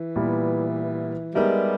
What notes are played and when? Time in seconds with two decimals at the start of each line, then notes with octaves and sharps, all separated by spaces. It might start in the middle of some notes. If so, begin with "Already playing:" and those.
Already playing: E3
0.16 A#2 G3 B3 E4
1.34 G3 G#3 B3 D#4 A#4 E5